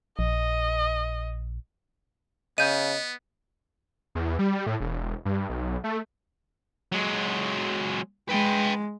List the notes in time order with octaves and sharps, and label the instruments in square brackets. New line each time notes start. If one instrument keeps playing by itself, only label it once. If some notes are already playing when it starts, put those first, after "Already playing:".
[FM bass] A#1 [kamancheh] D#5
[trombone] C#3 [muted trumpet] B3 [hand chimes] D#5 [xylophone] G6 D#7
[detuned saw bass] E2
G3
A2
E1
G2
B1
A3
[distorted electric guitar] F#3 G#3
[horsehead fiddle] G#3 [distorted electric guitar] B4 G5